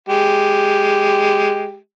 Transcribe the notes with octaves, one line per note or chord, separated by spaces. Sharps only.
G#3 G4